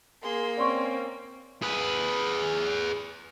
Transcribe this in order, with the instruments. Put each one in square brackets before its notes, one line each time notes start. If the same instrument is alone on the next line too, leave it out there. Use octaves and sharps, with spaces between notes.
[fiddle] A#3 [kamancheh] G#4 C6
[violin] C4 [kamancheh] C#4 [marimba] D5 C6 C#6
[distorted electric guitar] G#4 B4